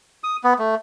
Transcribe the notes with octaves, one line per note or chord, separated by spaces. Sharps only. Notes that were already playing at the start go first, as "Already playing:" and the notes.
D#6
B3
A3